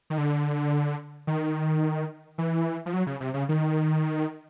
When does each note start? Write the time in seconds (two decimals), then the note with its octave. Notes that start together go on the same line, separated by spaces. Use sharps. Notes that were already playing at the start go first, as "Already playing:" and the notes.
0.10 D#3
0.18 D3
1.27 D#3
2.38 E3
2.86 F3
2.93 F#3
3.07 C#3
3.20 C3
3.34 C#3
3.49 D#3